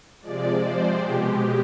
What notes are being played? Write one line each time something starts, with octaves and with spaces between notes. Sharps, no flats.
C3 F3 G#3 D5
C5
B2 G#3 G4